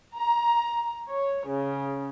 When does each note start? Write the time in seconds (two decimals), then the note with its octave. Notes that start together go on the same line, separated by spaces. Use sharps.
0.14 A#5
1.10 C#5
1.49 C#3